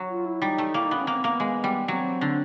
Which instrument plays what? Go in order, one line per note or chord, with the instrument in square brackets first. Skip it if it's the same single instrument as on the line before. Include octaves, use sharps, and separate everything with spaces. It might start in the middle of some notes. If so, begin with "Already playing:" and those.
Already playing: [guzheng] F#3
[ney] F4
E4
[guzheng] G3 [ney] D#4
[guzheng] A3
[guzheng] A#3 [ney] E4
[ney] D#4
[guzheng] B3 [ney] D4
[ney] C#4
[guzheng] A#3 [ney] C4
[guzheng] A#3 [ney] B3
[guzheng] G#3
G3
[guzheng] F#3 [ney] C4
[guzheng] D3